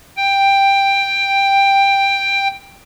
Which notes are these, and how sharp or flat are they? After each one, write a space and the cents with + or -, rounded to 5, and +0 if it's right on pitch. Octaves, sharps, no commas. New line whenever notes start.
G5 +10